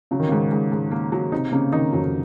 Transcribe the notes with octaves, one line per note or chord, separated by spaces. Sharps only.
C#3 F#3
D#3
G#2 C#3
G#2
G#2
A#3
F#3
C3 D#4
C#3 A#3
D#3 D#4
F2 F#3